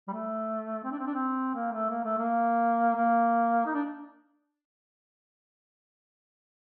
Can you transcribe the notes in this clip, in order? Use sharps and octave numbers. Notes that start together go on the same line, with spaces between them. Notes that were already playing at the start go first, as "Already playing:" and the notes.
G3
A3
C4
D4
C4
D4
C4
A#3
A3
A#3
A3
A#3
A#3
D#4
D4